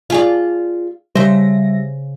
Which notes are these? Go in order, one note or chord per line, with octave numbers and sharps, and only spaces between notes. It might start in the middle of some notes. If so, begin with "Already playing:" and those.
F4 G#4 D5
C#3 G3 C5 E5 A#6